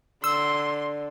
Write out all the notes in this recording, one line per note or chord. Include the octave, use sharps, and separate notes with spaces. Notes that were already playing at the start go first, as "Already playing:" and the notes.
D3 C6 E6